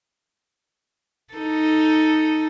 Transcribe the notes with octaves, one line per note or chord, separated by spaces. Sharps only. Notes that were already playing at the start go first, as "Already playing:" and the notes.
D#4 A4